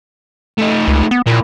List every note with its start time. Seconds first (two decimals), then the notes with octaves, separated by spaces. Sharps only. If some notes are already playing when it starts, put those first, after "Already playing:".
0.58 A3 D#4
0.88 C#2
1.11 B3
1.27 A#2 A#3 E4